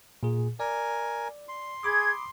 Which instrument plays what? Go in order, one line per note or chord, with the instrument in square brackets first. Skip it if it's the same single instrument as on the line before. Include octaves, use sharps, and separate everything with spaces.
[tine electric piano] A#2 G#4
[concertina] A#4 G#5 [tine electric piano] D5
[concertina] C6
[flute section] G#4 G#6 [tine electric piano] B5 D6 D#6